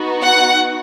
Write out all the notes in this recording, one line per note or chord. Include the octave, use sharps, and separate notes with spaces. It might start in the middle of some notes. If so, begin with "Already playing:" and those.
Already playing: B3 D#4 F#4
F#5